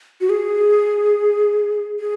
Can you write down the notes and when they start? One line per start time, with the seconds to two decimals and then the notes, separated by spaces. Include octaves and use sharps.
0.21 F#4
0.30 G#4
2.00 G#4